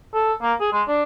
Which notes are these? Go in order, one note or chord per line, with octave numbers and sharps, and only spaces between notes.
A4
A#3
G#4
G#3
D4